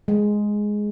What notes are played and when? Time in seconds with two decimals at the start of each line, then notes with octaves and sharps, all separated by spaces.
0.08 G#3